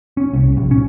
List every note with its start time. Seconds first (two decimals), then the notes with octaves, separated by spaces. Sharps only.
0.17 C#4
0.33 C2
0.57 A#1
0.71 C#4